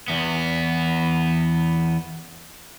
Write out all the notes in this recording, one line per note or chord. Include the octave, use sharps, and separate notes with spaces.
E2 B3